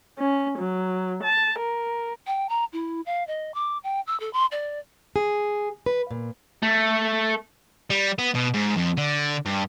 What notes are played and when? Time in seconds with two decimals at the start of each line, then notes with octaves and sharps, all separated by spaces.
0.18 C#4
0.58 F#3
1.23 A5
1.59 A#4
2.27 G5
2.49 A#5
2.73 E4
3.06 F5
3.27 D#5
3.54 D6
3.84 G5
4.07 E6
4.20 A4
4.33 C6
4.52 D5
5.16 G#4
5.86 B4
6.11 A#2
6.63 A3
7.90 G3
8.18 B3
8.35 B2
8.54 G#2
8.77 F2
8.98 D3
9.46 G2